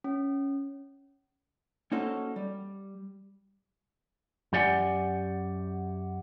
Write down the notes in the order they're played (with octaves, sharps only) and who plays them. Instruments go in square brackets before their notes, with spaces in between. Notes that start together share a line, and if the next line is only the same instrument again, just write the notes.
[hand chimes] C#4
[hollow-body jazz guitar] A#3 C#4 D#4 F#4 A4 C5
G3
[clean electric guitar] F#2 G4 D5 F#5 G#5